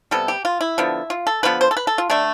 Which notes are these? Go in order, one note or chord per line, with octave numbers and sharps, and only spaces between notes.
C3 G3 B3 A4
G4
F4
E4
D3 F3 B3
F4
A4
D3 F3 B3 B4
C5
A4
B4
A4
F4
D3 A3 D4